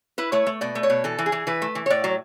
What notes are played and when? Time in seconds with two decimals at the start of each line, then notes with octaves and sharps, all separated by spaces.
0.18 E4 B4
0.32 A3 C#5
0.47 A3
0.61 B2 D5
0.75 A3
0.83 C#5
0.90 B2
1.04 E3 A4
1.18 E3
1.26 G#4
1.32 E3
1.47 E3 B4
1.62 A3
1.75 E3
1.86 C#5
1.90 A2 D5
2.04 F#3